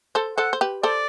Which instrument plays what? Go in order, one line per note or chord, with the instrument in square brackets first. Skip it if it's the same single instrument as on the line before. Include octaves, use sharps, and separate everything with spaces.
[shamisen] A4 C5
[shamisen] A4 C5 [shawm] F#5
[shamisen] C5
G4 B4
[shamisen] A4 C5 [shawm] D5